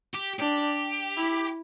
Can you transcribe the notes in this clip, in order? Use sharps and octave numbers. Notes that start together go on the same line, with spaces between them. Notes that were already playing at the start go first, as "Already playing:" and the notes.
G4
D4 G4
E4